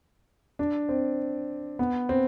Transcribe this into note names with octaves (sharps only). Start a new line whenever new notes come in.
D4
C4
B3
C4